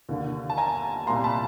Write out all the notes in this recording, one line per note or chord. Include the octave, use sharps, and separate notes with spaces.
D#2 D3
A5
G#5 A#5
C2 A#2 A#5 C6
A5 B5